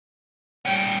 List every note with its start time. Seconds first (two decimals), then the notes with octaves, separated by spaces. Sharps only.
0.65 G3 C#4 G5